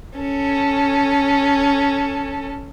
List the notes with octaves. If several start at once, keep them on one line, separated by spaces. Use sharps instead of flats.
C#4 A4